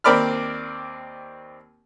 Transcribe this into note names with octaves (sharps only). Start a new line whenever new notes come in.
D#2 C4 A#4 D5 B5 F6